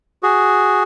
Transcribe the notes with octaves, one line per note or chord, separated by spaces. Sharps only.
F#4 G#4